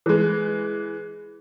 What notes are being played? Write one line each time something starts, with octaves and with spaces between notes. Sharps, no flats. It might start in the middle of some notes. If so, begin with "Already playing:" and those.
E3 G#3